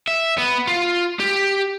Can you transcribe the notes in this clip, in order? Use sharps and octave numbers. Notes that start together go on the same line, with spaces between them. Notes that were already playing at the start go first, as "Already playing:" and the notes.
E5
B3
F4
G4